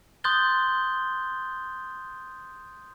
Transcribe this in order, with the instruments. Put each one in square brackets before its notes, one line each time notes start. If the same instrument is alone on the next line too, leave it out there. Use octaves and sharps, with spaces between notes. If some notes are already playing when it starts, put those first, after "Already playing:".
[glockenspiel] C6 D#6 F#6 G6 A6 G7